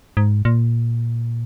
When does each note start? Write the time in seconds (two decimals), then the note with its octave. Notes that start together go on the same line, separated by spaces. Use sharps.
0.17 G#2
0.45 A#2